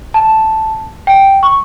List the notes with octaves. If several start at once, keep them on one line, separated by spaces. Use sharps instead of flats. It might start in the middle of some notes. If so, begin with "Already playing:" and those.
A5
G5
C#6